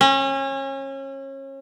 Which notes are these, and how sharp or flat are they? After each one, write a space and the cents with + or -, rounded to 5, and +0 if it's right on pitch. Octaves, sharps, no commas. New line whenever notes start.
C#4 -30